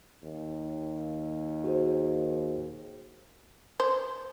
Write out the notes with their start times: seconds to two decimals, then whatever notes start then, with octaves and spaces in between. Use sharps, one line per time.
0.23 D#2
1.64 F#4 G#4 C5
3.80 C5